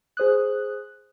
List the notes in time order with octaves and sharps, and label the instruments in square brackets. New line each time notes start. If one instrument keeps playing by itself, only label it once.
[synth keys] G#4 C5 D#6 F#6